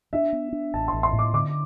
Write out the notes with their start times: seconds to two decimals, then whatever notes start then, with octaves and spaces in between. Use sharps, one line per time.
0.13 D4 E5
0.33 B3
0.52 D4
0.74 A1 A5
0.88 A1 C6
1.03 C6
1.13 A2
1.19 D6
1.33 D3 D6